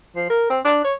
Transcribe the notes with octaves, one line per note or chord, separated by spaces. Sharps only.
F3
A#4
C4
D4
C#5